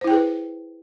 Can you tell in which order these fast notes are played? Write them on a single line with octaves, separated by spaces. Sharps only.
C5 E4 G5 G#4 B4